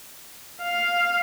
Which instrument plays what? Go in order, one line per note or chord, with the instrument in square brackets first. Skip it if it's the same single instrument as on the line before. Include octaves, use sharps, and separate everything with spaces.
[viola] F5